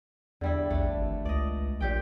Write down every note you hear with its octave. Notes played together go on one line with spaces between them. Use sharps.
E2 D3 G3 E4
A#1 A3 D4
G#1
C#2 D5 D#5
A#1 A#2 G4 G5